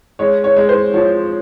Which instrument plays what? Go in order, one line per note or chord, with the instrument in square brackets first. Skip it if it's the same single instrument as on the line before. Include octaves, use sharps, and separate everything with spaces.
[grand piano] G#3 [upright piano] C#5
[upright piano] C#5
[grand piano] G#3
[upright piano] C5
[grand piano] F3 [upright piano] C#5